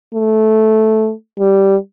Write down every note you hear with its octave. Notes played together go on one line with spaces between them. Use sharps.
A3
G3